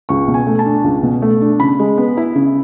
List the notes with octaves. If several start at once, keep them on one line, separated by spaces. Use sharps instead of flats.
C#2 C#6
B2
G#5
A3
A5
D4
C#2
B2
A3
D4
C#3 B5
G#3
B3
E4
C#3